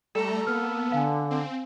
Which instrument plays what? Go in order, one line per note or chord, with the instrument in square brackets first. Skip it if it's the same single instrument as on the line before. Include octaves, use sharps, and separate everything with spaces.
[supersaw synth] G3 A3 A#5 [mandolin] A4
[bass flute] A#3 [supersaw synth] B3 [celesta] F6
[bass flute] D3 [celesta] F5 G#5
[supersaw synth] C4